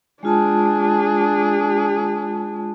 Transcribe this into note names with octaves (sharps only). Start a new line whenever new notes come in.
G#3 D4 F4 G#4 A5